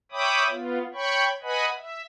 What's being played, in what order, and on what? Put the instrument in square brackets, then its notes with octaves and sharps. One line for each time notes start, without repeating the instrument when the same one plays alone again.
[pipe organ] C#5 E5 G5 B5 D6 D#6
B3 F4
C#5 G5 B5 C#6
B4 D#5 F#5 G#5 B5
E5